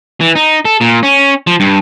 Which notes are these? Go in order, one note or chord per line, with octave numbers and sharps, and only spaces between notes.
E3
D#4
A4
A#2
C#4
F3
G2